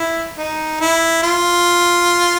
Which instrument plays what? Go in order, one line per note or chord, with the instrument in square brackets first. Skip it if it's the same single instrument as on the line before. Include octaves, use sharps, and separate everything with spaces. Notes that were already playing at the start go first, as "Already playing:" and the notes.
Already playing: [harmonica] E4
D#4
E4
F4